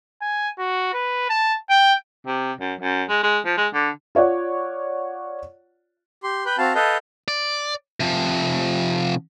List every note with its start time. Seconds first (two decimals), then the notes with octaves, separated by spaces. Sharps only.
0.22 G#5
0.59 F#4
0.94 B4
1.30 A5
1.70 G5
2.27 C3
2.60 F#2
2.81 F#2
3.09 G#3
3.23 G#3
3.46 F3
3.58 G#3
3.74 D3
4.15 F4 C#5 D5 F#5
6.24 G4 C6
6.46 B4 G5 B5
6.58 C4 F#4 F5 A5
6.75 A4 B4 D#5 F5 G5 A5
7.28 D5
8.00 C3 F3